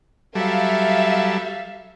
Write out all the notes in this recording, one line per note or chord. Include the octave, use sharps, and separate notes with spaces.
F#3 G3 A4 E5 F5